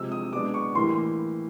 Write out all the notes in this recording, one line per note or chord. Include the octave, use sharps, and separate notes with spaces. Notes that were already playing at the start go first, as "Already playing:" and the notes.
Already playing: C3 F3 G#3 E6
D#6
B2 G#3 B3 D4 D6
C#6
A2 E3 G3 A#3 C6